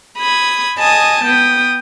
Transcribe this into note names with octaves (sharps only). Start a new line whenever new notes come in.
B5 D#6 G#6
D#5 G#5 A5 D#6
B3 G5 D#6